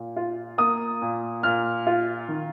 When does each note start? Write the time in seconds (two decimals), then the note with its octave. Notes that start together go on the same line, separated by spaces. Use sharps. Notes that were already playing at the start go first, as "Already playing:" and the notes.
Already playing: A#2
0.16 F4
0.58 A#3 D#6
1.02 A#2
1.43 A#2 F6
1.87 F4
2.28 D#3